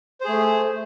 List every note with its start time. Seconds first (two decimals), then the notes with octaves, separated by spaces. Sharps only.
0.21 C5
0.24 G#4
0.28 A3